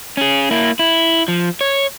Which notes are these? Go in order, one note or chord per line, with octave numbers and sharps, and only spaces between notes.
C#4 G#4
A#3 E4
E4
F3
C#5